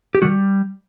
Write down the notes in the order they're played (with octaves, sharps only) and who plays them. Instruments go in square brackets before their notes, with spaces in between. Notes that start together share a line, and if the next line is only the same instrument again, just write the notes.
[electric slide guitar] G4
D#3 G3 F#4